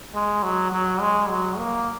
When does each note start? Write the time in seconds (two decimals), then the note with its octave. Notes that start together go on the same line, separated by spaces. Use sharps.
0.14 G#3
0.43 F#3
0.72 F#3
1.01 G#3
1.30 F#3
1.58 A#3